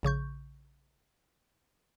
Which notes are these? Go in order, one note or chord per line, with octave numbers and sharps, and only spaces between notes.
A#1 C#3 C#6 G6